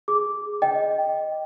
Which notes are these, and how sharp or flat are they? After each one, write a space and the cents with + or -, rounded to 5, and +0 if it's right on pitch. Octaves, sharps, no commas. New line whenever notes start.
G#4 +0 D6 -10
D#5 +0 G5 +0